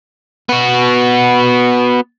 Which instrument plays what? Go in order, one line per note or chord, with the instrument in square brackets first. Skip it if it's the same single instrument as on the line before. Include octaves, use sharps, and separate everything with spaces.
[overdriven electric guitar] B3 F#4